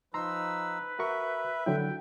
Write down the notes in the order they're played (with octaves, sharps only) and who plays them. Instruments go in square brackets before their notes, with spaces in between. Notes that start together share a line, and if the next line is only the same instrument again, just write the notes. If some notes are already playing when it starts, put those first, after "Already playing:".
[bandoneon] F3 D#4 E6 [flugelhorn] B4 [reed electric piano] A#5 C6
[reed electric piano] F#4 A#4 C#6 [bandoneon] E5
[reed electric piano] D3 F#3 E4 [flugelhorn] G5